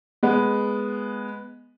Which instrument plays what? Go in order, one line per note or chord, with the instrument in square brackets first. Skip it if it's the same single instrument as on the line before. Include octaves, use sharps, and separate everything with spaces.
[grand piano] G#3 B3